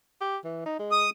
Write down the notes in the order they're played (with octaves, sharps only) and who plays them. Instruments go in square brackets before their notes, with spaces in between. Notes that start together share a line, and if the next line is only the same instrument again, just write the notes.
[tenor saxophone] G4
E3
D#4
G#3
[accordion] D#6